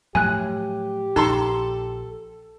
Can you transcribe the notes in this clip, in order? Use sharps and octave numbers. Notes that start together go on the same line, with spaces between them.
A2 F3 F#3 G4 G#5 F#6
A#1 D#4 A4 A#5 C6